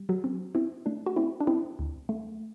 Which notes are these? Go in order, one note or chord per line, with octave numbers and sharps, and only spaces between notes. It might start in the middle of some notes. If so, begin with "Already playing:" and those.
Already playing: G3
F#3 F#4
C4
C4 E4
A3 D4
F#4
C4 E4
D4
C4 E4
D2
A3